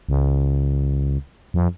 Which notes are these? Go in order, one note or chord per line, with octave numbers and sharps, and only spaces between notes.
C#2
F2